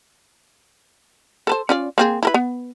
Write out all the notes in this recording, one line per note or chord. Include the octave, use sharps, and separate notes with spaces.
A4 B4 C5
C#4 F4 D5
A#3 C4 G#4
E4 A#4 B4
B3